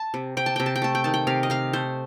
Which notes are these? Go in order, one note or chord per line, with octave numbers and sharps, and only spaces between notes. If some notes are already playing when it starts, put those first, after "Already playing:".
Already playing: A5
C3
C3 G5
A5
C3 G5
A5
G5
A3 A5
G5
D#3 A5
G5
C3 F5
D#5
C3 F5
A3 C5